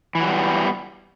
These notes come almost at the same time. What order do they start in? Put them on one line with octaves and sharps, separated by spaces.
E3 F#3 G3 B3